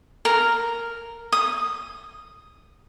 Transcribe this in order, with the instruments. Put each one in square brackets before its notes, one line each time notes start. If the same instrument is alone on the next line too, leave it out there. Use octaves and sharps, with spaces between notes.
[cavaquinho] A#4
D#6